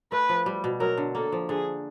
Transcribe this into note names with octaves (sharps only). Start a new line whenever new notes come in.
A3 B4
F3
G3
B2
F#3 A#4
D3
A#3 A4
F3
D3 G#4